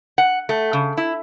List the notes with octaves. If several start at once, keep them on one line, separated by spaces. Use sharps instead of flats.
F#5
A3
C#3
E4